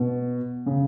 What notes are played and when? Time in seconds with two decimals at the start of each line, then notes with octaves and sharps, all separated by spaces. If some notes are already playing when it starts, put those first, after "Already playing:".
Already playing: B2
0.66 C#3